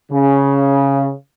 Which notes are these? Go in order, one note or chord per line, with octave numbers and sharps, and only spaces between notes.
C#3